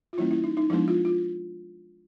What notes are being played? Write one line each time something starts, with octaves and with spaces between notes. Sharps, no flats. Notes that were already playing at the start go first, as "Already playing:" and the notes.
F4
E3 G3 A#3 C#4 E4
E4
D#4
D#4
F3 G#3 B3 D4 E4
F4
F4